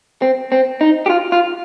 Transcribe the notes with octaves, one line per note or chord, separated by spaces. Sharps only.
C4
C4
D#4
G4
F4
F4